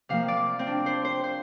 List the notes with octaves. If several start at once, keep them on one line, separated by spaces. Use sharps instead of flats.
C3 F3 A#3 F5
D5
C4
D4
C5
C5
C5